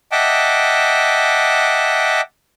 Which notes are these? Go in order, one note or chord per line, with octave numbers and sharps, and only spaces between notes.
D#5 E5 F#5 G5 A5 D6